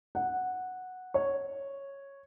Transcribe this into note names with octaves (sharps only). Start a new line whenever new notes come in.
F#5
C#5